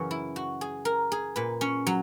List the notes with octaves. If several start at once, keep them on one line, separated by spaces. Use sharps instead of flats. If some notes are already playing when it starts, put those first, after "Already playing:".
Already playing: F#2 C#3 E3 C#4
E4
F#4
G#4
A#4
G#4
A#2 B4
C#4
F#3